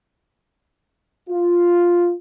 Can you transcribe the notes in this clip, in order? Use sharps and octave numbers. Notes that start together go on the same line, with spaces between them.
F4